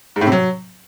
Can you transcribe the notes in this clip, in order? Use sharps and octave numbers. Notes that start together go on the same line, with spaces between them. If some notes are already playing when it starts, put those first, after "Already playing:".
G#2
A2
C3
F#3